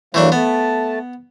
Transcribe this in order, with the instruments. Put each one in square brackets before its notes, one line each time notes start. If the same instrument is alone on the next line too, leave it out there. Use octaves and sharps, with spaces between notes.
[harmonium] G2 F#3 A#3 [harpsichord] E3 A3 D4
[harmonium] A3 A5 [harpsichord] B3